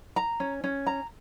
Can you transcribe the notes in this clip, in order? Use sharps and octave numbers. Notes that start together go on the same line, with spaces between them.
A#5
C#4
C#4
A#5